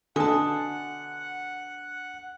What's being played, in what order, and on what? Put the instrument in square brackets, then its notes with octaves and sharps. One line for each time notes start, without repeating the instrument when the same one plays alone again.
[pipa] B2 A5 [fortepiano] D3 [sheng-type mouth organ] F#5 [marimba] G#5 D#6